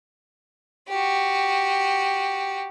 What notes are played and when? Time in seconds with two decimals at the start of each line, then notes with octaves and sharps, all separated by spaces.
0.89 F#4 G4